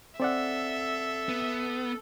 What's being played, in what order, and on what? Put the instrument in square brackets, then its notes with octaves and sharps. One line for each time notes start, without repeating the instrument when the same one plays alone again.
[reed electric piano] C4 D5 F#5 [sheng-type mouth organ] A4 [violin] E5
[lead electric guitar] B3